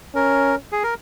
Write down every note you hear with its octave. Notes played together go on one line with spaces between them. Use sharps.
C#4 A#4
G#4
A#4